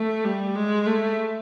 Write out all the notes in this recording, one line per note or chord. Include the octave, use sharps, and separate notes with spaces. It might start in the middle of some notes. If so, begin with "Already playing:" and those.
Already playing: A3
G3
G#3
A3